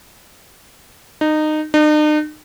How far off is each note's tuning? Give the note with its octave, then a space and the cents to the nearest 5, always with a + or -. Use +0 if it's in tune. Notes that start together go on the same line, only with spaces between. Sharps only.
D#4 -20
D#4 -45